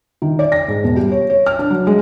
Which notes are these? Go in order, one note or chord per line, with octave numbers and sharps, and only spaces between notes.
D#3
D5
A#6
G#2
E1
G3
C#5
C#5
F6
D4
F#3
G#3